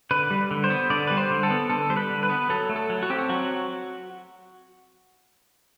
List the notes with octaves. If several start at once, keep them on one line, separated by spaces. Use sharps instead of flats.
D3 B4
G3
D3
C5
B3
D3 D5
G3 B4
C5
D3
A4
B3
D3 A4
G3 C5
B4
D3
B4
B3
F#3 A4
A3
A4
F#3
F#4
C4 G4
F#4
F#3 F#4